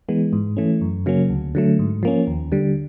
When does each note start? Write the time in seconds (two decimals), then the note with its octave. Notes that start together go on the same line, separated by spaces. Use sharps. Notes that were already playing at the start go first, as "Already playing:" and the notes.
0.08 E3 G#3 B3
0.33 G#2
0.57 E3 A3 C#4
0.81 F#2
1.06 C#3 F#3 A#3 C#4
1.30 D2
1.55 D3 F#3 A3
1.79 G#2
2.03 F3 A#3 C#4
2.27 D#2
2.52 D3 G3